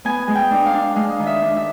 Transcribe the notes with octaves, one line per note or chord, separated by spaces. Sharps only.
B3 G#5
G#3
G5
D4
F5
D4
G#3 F5
D#3
E5
D4
E5